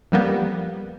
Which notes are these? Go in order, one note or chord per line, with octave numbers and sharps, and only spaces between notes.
F2 G3 A#3 B3